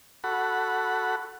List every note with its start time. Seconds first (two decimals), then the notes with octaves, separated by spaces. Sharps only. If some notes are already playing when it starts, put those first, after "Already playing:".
0.24 F#4 A4 F#5 B5